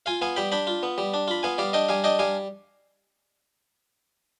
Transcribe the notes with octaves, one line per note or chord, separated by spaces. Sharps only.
F4 F5 G#5
B3 F5 G#5
G3 G5 B5
D4 G5 B5
F4
B3
G3
D4
F4 B5
B3 F5 G#5
G3 D5 F5
D4 D#5 G5
G3 F5 G#5
D4 D#5 G5
G3 F5 G#5